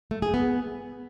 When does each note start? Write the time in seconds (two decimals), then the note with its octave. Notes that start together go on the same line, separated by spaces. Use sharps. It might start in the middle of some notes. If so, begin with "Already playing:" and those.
0.11 A3
0.22 G#4
0.34 B3